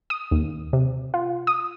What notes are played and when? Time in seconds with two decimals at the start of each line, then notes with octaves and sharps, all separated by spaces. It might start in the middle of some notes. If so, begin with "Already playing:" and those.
0.10 D#6
0.31 D#2
0.73 C3
1.14 F4
1.47 D#6